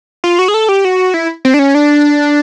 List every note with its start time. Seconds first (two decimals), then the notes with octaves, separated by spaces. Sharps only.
0.24 F4
0.39 F#4
0.48 G#4
0.54 A4
0.69 G4
0.85 F#4
1.14 E4
1.45 C4
1.54 D4
1.59 C#4
1.75 D4